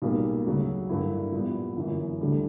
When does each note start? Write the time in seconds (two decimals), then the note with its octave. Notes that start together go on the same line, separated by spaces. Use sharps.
0.02 B1 A#2 G3 A#3
0.46 D2 C#3 F#3
0.89 G2 D3 A#3 E4
1.32 A#1 A#2 G3 B3
1.76 G1 F#2 E3
2.20 D2 D3 G3